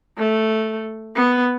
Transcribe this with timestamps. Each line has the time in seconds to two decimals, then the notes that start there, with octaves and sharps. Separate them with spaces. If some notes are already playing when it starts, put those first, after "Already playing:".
0.18 A3
1.15 B3